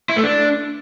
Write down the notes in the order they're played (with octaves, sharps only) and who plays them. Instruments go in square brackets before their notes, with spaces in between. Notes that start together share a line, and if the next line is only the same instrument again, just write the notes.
[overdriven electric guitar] E4
A3
D4